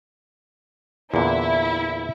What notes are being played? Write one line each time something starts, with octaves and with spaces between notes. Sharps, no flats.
E2 A#2 D3 E4